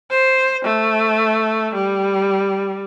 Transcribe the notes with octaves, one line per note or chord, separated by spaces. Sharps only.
C5
A3
G3